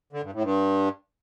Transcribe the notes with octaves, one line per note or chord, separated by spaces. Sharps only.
D3
G2
A2
G2